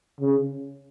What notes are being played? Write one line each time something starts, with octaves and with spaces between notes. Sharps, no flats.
C#3